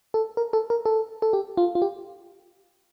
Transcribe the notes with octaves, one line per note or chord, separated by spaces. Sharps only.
A4
A#4
A4
A#4
A4
A4
G4
F4
F4
G4